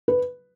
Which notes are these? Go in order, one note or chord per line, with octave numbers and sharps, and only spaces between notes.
B4